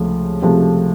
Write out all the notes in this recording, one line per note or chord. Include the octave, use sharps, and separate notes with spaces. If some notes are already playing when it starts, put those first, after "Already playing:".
Already playing: C#2 C3 F3 A3
C#2 C3 F3 A3